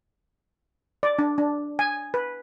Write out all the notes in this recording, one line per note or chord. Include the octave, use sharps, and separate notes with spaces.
D5
D4
D4
G#5
B4